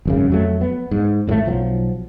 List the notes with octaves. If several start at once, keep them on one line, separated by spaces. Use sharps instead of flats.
G#1 F#2 C#3
F2 F#3 A3
B3
G#2
G#1 A2 C#3 A3
B1 F3 F#3